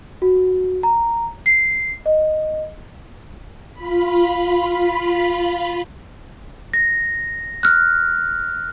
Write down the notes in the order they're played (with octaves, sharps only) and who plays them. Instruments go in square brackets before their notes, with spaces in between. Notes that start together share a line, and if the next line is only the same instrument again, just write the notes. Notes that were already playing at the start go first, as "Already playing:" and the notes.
[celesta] F#4
A#5
C7
D#5
[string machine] F4 B5
[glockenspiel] A#6
F6 F#6